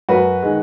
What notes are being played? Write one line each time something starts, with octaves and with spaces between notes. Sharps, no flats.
F#2 F#4 B4
D#3 G#3